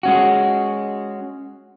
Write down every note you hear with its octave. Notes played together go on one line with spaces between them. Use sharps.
G#3 C#4 F#4